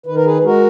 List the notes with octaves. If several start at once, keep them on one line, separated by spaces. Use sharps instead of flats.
D#3 B4
A#4
G#4 B4
G#3 F#4 A#4